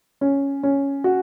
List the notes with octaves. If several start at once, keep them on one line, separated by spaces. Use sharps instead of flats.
C#4
C#4
F#4